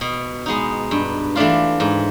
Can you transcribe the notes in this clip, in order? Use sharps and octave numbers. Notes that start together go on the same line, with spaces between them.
B2
G#3 B3 D#4
G2
E3 A3 D4 F4
G#2